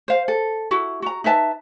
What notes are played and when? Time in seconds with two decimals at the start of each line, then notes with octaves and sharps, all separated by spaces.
0.08 C5 F5
0.28 A4
0.71 E4 F#4
1.02 F#4 A#5
1.24 D#4 B4 E5 A5